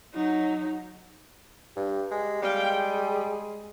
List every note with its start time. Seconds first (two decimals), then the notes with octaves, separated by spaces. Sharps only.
0.14 F#3 D#4
1.76 G2 G4
2.11 G#3 G4
2.43 G3 G#3 F5 G5
2.75 G#4